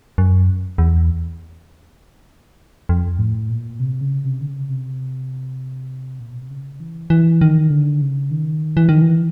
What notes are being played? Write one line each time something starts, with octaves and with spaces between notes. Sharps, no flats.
F#2
E2
F2
A2
A#2
C3
C#3
C3
D3
C#3
C3
A#2
B2
C3
C#3
E3
E3
D#3
D3
C#3
D#3
E3
D#3
E3